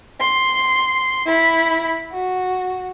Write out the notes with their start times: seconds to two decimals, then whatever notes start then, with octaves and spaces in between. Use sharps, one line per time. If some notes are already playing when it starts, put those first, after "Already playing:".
0.20 C6
1.26 E4 B5
2.12 F#4